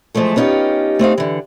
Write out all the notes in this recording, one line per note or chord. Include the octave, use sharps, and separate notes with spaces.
E3 F3 G#3 A3 A4
B3 C#4 D#4 F4 G4
A3 C4 D#4 F5
D3 E3